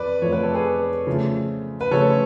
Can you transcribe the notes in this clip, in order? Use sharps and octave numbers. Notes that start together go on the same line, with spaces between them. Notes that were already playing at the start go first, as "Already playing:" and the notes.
Already playing: F2 B4 D5
F2 F3 A3 C#5
B4
A4
G#4 B4
C#3 F3 A3 F4
B4
C#3 F3 A3 F4 A4 C#5